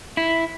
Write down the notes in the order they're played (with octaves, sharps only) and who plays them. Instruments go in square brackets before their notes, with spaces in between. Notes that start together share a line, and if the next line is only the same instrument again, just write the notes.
[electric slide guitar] E4